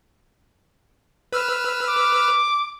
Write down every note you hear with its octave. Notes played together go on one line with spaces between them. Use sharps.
B4 E6 F6
D6